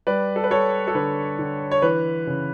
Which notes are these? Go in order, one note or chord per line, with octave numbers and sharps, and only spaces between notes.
G3 B4 D5
A4
B4
G3 A4 C#5
A4
D3 B4
D3
C#5
E3 B4
C#3